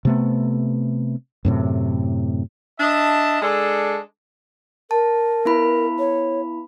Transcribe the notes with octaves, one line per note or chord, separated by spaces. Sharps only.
C3 A3 B3
F#2 A2 C3
D4 D#5 E5 A5
G#3 D4 A4
A#4 A5
B3 E4 B5
C#5